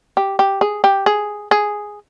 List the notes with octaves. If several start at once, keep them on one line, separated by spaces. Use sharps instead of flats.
G4
G4
G#4
G4
G#4
G#4